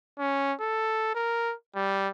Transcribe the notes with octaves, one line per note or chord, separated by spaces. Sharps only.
C#4
A4
A#4
G3